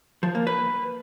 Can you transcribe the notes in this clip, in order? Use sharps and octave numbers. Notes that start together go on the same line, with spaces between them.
F3
A#3
B4